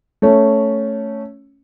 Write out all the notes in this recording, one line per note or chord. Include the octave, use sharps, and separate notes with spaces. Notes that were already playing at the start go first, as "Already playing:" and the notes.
A3 C#4